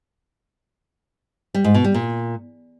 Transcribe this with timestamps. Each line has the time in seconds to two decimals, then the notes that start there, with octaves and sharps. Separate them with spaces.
1.54 G3
1.64 G#2
1.74 B2
1.84 G3
1.94 A#2